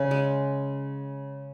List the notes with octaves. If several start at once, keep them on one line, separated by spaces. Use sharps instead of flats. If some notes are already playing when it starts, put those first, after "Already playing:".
Already playing: C#3
G#3